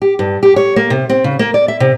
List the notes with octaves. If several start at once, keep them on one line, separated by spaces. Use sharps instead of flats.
G4
G2
G4
C#5
A#3
C3
C4
C#3
A#3
D5
E5
C3